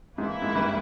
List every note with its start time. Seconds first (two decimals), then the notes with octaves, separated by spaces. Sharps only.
0.18 G#2 E3 A#3 E4
0.42 G#2
0.55 G2